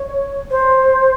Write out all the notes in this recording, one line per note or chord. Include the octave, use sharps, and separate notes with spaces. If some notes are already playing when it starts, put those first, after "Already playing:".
Already playing: C#5
C5